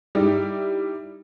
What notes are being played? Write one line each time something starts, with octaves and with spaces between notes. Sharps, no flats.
G3 D#4 E4 G4